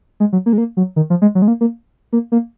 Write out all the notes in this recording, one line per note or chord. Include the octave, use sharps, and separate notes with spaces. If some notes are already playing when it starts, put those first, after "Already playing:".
G#3
F#3
A#3
G#3
A#3
F#3
D#3
F3
G#3
F#3
G#3
A#3
A#3
A#3
A#3